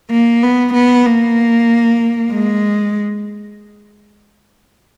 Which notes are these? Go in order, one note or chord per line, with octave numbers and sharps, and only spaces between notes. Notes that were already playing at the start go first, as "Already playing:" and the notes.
A#3
B3
B3
A#3
G#3